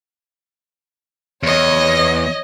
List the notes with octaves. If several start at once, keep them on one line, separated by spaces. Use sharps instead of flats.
E2 C#5 D#5